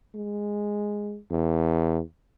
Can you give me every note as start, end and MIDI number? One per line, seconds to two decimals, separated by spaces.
0.15 1.18 56
1.31 2.00 40